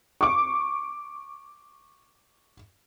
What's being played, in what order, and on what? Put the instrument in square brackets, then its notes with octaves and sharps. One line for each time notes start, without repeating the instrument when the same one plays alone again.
[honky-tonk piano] C#6 D6